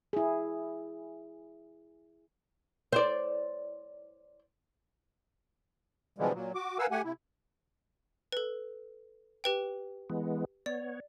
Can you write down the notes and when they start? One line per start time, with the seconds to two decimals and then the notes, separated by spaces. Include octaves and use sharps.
0.13 E4 G#4
2.93 C5 D5
6.18 B2 D3 E3 F3 G3 G#3
6.34 A#2 F#3
6.54 F#4 D6
6.79 A#4 B4 F5 F#5 G#5 E6
6.91 A3 G4 F#5 G#5
7.04 C3 E4
8.32 A4 B4
9.44 G4 B4 G5
10.10 E3 G#3 B3
10.66 B3 C#5 D5